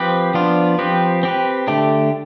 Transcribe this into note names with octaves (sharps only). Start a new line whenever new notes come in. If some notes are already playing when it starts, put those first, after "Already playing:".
Already playing: F3 C4 G4 B4
F3 B3 D4 F4
F3 C4 G4 B4
C4 G4 B4
D3 A3 D4 G4